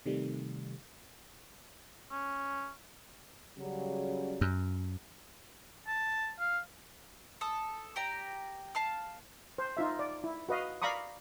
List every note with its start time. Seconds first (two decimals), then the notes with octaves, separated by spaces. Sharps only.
0.06 C3 D#3 G3 A3
2.11 C#4
3.58 C#3 F#3 G3
4.41 F#2
5.87 A5
6.39 F5
7.41 A4 D#6
7.96 G4 D5 A#5
8.75 F5 A5 F6
9.58 C5
9.77 D#4 F4 E5
9.99 D5
10.24 E4
10.49 F#4 B4 D#5 F5
10.82 D5 F5 A#5 B5 C#6 D#6